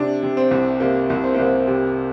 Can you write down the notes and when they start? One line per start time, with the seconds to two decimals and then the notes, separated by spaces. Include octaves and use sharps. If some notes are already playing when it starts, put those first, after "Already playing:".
Already playing: C3 D4
0.22 C3
0.37 C4
0.51 C2
0.80 C3 A#3
1.10 C2
1.24 C4
1.35 C2 A#3
1.45 C4
1.67 C3